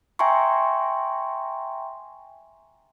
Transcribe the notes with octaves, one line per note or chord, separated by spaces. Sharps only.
E5 G5 G#5 A#5 C6 C#6